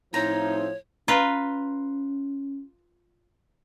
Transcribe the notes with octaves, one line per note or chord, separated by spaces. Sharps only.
A2 F3 C4 D#4 E4 C#5 A#5
C#4 F4 B4 A#5